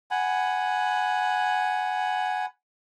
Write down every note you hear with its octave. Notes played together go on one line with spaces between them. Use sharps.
F#5 G#5 B5